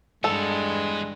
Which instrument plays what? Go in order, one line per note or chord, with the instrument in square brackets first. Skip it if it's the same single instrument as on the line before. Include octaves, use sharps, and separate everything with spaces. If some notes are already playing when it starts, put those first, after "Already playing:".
[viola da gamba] G2 [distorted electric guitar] E3 B3 [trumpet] G#3 [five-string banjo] A4